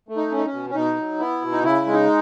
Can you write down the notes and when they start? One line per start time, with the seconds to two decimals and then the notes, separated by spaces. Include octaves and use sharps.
0.09 A3
0.17 D#4
0.32 C#4
0.37 D#4
0.46 C#4
0.53 B2
0.70 C#4
0.75 B2 D#4
0.97 F#3
1.19 B3 E4
1.42 B2
1.52 D#4
1.63 C#3 E4
1.86 G#3
1.93 D#4